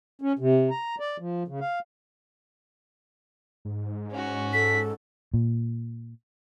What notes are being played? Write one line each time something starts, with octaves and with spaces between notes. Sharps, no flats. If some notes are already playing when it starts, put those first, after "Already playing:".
C#4
C3
A#5
D5
F3
C#3
F5
G#2
C#4 F#4
A4 B6
A#2